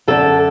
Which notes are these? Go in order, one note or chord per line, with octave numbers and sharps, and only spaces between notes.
F#2 D3 A4